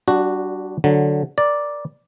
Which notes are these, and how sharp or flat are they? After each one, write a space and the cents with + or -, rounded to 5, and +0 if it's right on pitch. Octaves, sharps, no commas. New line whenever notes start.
G3 -30 D4 +0 F#4 +0
D3 +0 F#3 +0
A#4 +20 D5 +0